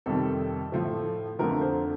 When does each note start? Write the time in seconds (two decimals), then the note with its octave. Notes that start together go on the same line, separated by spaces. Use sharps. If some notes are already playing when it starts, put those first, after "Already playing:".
0.06 F2 C3 D#3 G3 A4
0.72 A2 F3 A3
1.39 F2 D3 F3 A3 A#4
1.61 C5